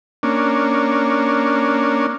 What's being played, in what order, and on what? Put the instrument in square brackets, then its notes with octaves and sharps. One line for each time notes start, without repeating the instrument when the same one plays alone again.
[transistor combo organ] A#3 C#4 D4